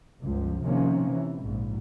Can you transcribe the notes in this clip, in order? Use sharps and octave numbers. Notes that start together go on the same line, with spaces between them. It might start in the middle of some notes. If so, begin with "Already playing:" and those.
G1 C#2 F3
C3 D#3 F3 A#3 C4 C#4
E3
A#1 G#2